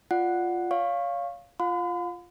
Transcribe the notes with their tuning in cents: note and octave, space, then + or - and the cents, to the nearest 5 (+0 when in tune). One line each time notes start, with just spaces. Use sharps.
F4 +0 D5 +0 F#5 +0
C#5 +35 F5 +0 C#6 -20
F4 -5 F5 +35 B5 +45